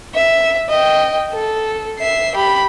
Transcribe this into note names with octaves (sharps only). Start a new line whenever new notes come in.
E5
D#5 G5
A4
E5 C7
G4 B5